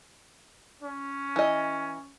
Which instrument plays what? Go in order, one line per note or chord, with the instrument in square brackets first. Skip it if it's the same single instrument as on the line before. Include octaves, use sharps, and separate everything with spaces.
[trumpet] C#4
[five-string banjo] E3 D#5